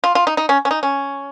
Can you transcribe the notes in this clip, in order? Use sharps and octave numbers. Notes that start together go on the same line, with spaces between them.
F4
F4
D#4
D#4
C#4
C#4
D#4
C#4